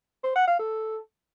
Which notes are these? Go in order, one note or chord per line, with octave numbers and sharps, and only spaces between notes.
C5
F#5
F5
A4